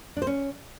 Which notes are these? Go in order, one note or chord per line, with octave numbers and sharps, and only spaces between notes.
D4
C5
C#4